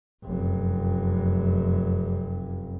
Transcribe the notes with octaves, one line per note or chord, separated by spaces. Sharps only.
F1 F#2